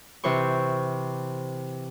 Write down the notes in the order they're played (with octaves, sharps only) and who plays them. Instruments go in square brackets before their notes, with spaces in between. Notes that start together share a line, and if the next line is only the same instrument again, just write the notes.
[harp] C3 E3 C5 C#6